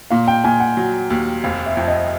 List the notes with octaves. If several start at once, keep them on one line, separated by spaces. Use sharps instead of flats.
A#2 F5
G5
A#2 G#5
F#5
F#3
D#2
F1 F5
E5
F2
D#5